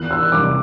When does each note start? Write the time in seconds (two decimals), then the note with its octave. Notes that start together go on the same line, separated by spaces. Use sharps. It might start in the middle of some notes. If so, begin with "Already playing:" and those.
Already playing: E2 F#6
0.11 E6
0.32 C3 G3 D6